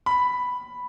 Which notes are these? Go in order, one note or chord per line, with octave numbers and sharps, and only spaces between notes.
B5